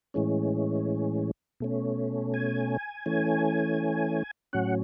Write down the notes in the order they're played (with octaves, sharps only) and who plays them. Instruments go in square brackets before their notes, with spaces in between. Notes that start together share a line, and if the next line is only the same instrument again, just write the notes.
[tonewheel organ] A2 E3 G#3 C#4
B2 A3 C#4
G#5
E3 A3 C#4
A2 F#3 C#4 F#5